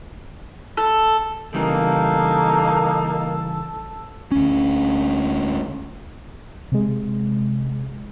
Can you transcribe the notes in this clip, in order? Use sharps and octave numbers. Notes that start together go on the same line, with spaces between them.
A4
C#3 E3 G3 A#3 D#4 A4
D2 C#4
C3 G#3